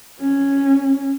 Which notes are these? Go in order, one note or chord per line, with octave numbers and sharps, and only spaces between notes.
C#4